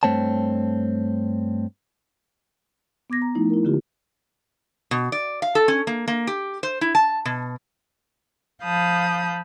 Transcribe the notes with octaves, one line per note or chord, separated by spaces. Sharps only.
G2 E3 A3 C4 C#5 A5
B3 D6 G#6 A#6
A#5
F3 A3 D#4 E4
E4 A#4
D3 A#3 E4 F4 G4
B2
D5
F5
A4
C#4
A#3
A#3
G4
C5
E4
A5
B2
F3 F5 A5 B5 D#6 G6